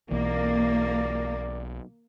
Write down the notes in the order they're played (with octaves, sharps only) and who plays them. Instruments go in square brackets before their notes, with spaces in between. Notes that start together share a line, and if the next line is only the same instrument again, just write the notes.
[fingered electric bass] B1 E3 [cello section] A#3 [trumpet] D5